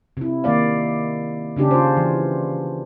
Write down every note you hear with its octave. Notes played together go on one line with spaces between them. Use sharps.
C3 E4
D#3 A#3 D5 F5
C#3 C#4 D4 G4
F4 C5
E3